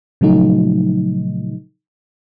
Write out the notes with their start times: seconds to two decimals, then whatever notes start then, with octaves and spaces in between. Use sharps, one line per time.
0.21 A#2 C#3 F3 F#3 A3 D#4